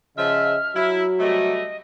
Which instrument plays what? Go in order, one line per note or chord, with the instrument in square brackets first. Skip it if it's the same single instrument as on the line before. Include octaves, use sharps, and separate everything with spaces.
[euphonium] C#3 [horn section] F3 E5 [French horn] D#5 [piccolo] F6
[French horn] F#3 [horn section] E4 [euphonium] F#4
[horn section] C3 G3 A3 [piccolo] D#5